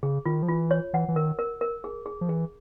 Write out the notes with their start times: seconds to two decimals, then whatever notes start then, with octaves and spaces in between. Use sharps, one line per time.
0.03 C#3 G#4
0.25 D#3 F4
0.43 F3
0.48 E3 F4
0.71 C#5
0.93 E3 F#5
1.08 E3
1.16 D#3 A#4
1.39 A#4
1.61 A#4
1.84 G#4
2.06 G#4
2.21 F3
2.29 E3 G#4